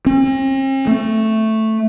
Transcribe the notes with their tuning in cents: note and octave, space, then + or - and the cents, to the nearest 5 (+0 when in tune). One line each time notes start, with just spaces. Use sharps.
C4 +45
A3 +0